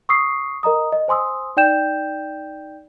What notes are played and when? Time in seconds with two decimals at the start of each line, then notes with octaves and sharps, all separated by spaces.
0.09 C#6 D#6 E6 C7
0.63 A#4 D#5 A#5 D#6
0.92 D#5
1.08 C5 G#5 C6 D#6 E6
1.57 D#4 D5 G5 G6 E7